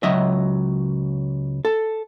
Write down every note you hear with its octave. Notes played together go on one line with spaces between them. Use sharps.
C#2 F#3 D#5 E5
A4